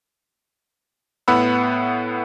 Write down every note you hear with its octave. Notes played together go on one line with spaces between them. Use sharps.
A2 B3 F#5 B5 E6